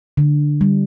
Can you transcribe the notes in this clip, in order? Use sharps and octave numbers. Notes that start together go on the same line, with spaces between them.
D3
G3